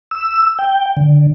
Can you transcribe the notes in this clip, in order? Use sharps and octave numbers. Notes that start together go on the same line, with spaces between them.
E6
G5
D3